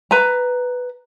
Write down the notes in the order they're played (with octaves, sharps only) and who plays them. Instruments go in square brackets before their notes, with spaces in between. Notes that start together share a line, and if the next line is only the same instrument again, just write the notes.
[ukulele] B4 A#5